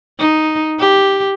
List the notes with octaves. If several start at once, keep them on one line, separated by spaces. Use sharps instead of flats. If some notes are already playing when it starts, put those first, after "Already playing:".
D#4
G4